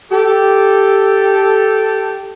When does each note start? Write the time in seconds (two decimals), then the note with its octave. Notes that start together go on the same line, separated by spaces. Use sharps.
0.10 G4 A4